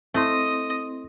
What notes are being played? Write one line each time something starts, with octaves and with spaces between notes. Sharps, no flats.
A3 C4 E4 D#5 C6